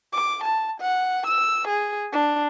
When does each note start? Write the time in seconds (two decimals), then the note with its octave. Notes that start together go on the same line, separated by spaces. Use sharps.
0.13 D6
0.43 A5
0.80 F#5
1.27 E6
1.68 G#4
2.12 D4